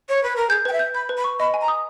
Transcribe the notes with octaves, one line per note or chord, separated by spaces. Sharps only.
C#5
B4
A#4
G#4 G6
B4 G5
E5
G6
B5 G6
B4
B5
C#6
D#5 B5
G#5
A#5
D#6